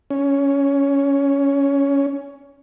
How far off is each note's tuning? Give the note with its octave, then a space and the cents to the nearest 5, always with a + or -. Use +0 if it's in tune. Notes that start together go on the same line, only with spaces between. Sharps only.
C#4 +10